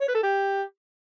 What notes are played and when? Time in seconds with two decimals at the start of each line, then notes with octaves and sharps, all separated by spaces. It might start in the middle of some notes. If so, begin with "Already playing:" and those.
0.01 C#5
0.08 B4
0.15 A4
0.23 G4